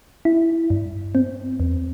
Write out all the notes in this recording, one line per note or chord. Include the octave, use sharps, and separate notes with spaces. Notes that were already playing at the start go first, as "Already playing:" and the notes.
E4
G2
C4
E2